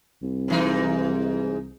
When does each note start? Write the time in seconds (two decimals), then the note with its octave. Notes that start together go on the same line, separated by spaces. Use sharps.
0.22 C2
0.48 G#2 E3 D#4